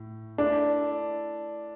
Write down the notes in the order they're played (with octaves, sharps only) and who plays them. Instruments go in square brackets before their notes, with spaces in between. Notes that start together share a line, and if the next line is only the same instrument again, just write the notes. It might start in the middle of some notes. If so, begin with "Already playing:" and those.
Already playing: [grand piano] A2
[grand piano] A3 E4 A4 E5 [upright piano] D4